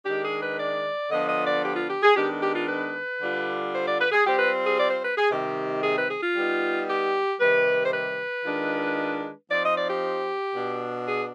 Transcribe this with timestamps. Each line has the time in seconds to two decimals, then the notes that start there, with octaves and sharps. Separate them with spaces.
0.06 D#3 G#3 D4 G4
0.23 G#4
0.41 B4
0.58 D5
1.11 D3 F3 B3 D4 F4 D#5
1.28 D#5
1.46 D5
1.64 G4
1.76 F4
1.89 G4
2.03 G#4
2.16 D#3 G#3 B3 D4 G4
2.42 G4
2.55 F4
2.68 B4
3.21 D3 G3 D4 F4
3.74 C5
3.86 D5
3.99 B4
4.12 G#4
4.25 G3 C4 F4 G4
4.39 B4
4.65 G#4
4.78 D5
4.91 C5
5.04 B4
5.17 G#4
5.30 C3 D#3 G3 C4 D#4 G4
5.83 G#4
5.96 B4
6.09 G#4
6.22 F4
6.35 G3 B3 D#4
6.87 G4
7.40 C3 D#3 G3 B4
7.86 C5
7.93 B4
8.45 D#3 G#3 D4 F4
9.50 F3 C4 D#4 D5
9.63 D#5
9.76 D5
9.89 G4
10.54 B2 B3 D4
11.07 G#4